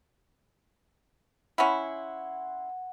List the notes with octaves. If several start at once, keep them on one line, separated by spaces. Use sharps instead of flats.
C#4 E4 F#5 G#5 C6